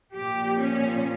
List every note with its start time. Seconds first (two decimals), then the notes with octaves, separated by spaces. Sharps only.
0.12 A#2 F3 G4
0.59 C#4